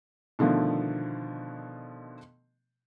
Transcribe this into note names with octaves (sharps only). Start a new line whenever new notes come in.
B2 D3 D#3 F3 A3